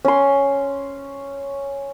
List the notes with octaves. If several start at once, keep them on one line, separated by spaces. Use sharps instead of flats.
C#4 C6